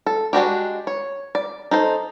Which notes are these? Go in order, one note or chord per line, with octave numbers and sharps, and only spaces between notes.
A4
G#3 D4 F#4 G4
C#5
D5
D#4 A4 C5